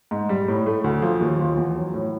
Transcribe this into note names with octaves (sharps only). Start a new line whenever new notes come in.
G#2
G3
A2
A3
D2
F3
D#2
F3
E2
F#3
A2